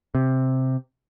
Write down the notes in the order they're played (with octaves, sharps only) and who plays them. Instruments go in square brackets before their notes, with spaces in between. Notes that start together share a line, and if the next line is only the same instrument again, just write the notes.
[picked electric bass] C3